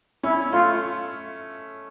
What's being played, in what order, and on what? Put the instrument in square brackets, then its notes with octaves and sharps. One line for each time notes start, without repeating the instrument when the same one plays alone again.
[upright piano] C#4 [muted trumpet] E4
[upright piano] A3 [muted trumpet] F4